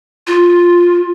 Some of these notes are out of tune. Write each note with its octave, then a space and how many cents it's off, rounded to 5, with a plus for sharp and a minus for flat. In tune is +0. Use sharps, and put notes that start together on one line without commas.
F4 +5